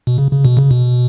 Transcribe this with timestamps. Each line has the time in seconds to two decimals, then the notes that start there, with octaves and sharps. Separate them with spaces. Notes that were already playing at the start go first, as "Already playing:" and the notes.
0.07 B2
0.18 C#3
0.32 C#3
0.45 B2
0.57 C#3
0.71 B2